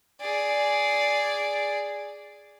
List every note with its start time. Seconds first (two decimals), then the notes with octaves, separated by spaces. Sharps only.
0.21 G#4 D5